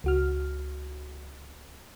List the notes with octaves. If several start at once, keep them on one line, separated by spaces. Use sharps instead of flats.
C#2 F#4 F6